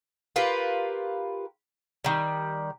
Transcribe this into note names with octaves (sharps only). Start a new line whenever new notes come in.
F4 G4 A#4 B4
D#3 G3